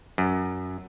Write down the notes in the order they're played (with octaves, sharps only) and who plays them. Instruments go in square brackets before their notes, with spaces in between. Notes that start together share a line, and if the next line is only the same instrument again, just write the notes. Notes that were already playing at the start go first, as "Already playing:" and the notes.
[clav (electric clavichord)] F#2